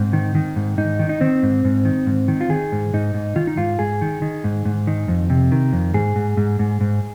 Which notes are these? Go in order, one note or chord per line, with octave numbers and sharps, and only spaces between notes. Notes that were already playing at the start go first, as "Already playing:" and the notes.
Already playing: G#2 C4
D#3
D#3
G#2
G#2 D#4
D#3
D#4
D#3 C4
G#2
G#2
D#3
G#2
D#3
F4
D#3 G#4
G#2
G#2 D#4
G#2
D#3 F4
D#4
G#2 F4
G#2 G#4
D#3
D#3
G#2
G#2
D#3
F2
C3
D#3
F2
G#2 G#4
G#2
G#2
G#2
G#2